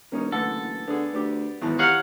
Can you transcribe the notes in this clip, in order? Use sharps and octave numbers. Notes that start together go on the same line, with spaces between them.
E1 A#3 C#4 D#4
F#1 D3 E3 A3 B3 A4
D3 B3 D4 G#4
D2 B3 D4 G4
B1 E2 G#2 D#3 E4 A5
G4 C#5 F5 F#5 A#5